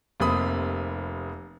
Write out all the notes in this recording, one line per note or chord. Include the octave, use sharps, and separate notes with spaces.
F1 C3 A#3 B5 D#6